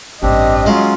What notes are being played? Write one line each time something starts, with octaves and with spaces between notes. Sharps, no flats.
A1 G2 C4 D4 G4 D#5
F#3 G#3 C#4 F4